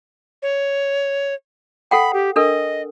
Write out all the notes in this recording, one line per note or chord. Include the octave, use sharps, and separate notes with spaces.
C#5
A4 F#5 G5 B5
G4
D4 A4 A#4 D#5